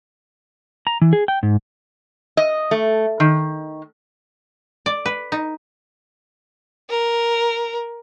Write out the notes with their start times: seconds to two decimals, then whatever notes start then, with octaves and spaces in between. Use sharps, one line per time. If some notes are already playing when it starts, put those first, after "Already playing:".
0.87 A#5
1.01 E3
1.13 G#4
1.28 G5
1.43 G#2
2.37 D#5
2.71 A3
3.20 D#3
4.86 D5
5.06 B4
5.32 D#4
6.90 A#4